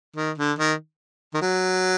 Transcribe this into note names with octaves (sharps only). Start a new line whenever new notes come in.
D#3
D3
D#3
D#3
F#3